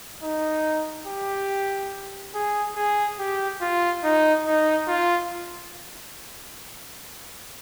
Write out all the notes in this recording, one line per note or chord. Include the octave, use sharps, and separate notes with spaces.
D#4
G4
G#4
G#4
G4
F4
D#4
D#4
F4